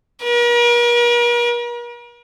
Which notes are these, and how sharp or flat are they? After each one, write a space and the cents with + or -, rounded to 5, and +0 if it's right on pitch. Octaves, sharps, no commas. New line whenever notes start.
A#4 +45